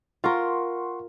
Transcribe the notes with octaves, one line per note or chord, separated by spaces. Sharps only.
F4 A#4 F#5 C6 C#6